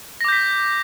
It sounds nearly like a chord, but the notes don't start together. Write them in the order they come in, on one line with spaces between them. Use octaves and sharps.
A#6 D6 G6 B6